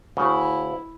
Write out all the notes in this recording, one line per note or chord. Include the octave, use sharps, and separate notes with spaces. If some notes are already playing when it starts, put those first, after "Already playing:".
D2 C#3 E4